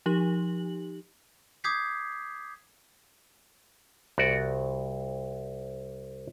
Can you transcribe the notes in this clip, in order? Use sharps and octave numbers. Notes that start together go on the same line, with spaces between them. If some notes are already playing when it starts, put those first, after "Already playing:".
F3 D#4 G4 F#7
D6 D#6 G6 G#6 B6 C7
C2 F#4 D5